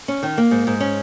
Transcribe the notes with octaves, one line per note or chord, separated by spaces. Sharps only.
C#4
D#3
A#3
G#2
G#2
C#4